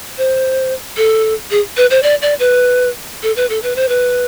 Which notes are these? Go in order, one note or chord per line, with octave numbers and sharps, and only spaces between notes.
C5
A4
G#4
B4
C5
D5
D5
B4
A4
B4
A4
B4
C5
B4